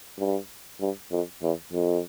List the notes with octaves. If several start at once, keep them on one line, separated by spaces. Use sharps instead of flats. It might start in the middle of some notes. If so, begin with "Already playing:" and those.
G2
G2
F2
E2
F2